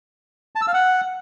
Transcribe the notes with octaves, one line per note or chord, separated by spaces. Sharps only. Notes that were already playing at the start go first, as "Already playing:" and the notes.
A5
E6
F5
F#5